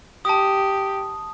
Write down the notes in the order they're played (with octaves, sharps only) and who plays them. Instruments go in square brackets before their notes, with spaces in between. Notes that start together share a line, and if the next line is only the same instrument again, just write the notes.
[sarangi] G4 [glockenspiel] A5 D#6